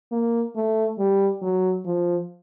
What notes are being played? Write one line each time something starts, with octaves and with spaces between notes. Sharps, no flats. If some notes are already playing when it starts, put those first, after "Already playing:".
A#3
A3
G3
F#3
F3